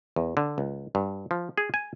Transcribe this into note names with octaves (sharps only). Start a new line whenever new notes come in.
E2
D3
C#2
G2
F3
G#4
G#5